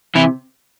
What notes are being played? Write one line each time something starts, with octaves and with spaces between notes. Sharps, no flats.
C3 E3 E4